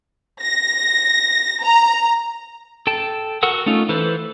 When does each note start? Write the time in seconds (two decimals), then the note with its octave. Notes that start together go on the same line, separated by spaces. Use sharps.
0.42 A#6
1.64 A#5
2.87 A4 G5 A5
3.43 F#4 A4 A#4 F#5 E6
3.66 A3 C#4 D#4 F4
3.89 E3 A4 B4 C5